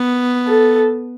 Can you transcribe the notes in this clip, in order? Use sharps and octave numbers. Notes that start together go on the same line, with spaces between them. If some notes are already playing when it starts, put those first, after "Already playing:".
Already playing: B3
A4